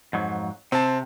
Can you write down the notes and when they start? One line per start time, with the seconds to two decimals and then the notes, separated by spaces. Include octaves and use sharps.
0.13 F2 G#2 F#3
0.72 C3 C4 A5